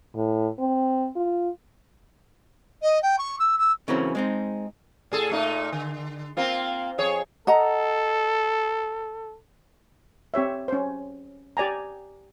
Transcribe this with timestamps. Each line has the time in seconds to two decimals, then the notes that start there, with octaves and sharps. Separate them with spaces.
0.16 A2
0.60 C4
1.16 F4
2.81 D#5
3.02 G5
3.18 C#6
3.39 E6
3.58 E6
3.88 C#3 E3 F#3 A#3 C4 C#4
4.15 G#3 C4 D#4
5.12 A2 G#4 A4
5.30 A#2 A3 D#4
5.72 D3
6.37 A#3 C4 F4
6.98 F2 G#4 C#5
7.47 A4 D#5 F#5 A#5
10.34 C4 G4 C#5 E5
10.68 C#4 C5
11.57 G4 D5 G#5 A#5